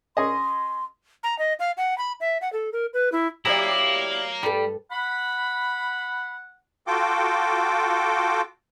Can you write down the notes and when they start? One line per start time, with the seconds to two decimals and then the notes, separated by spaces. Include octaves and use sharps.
0.17 C#4 G#4 D#5 C6
1.23 A#5
1.39 D#5
1.60 F5
1.77 F#5
1.98 B5
2.20 E5
2.41 F#5
2.53 A4
2.73 A#4
2.94 B4
3.12 E4
3.45 F#3 E4 G4 B4 D5 F5 A#5
4.43 G2 G3 A4
4.91 F#5 B5
6.87 F4 F#4 A4 G5 D6